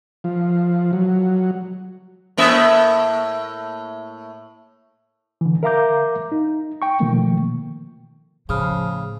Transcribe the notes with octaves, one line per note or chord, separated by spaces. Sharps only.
F3
F#3
A2 A#3 E5
D3 E3
A#4 E5 F5 A#5 D6 G6
D#4
G5 C#6
B2 D#3 F3 A3 A#3
A2 C#3 F3 B5 D#6 F6